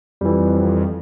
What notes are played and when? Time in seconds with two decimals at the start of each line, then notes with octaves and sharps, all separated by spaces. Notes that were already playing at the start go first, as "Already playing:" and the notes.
0.21 F2 E3 G3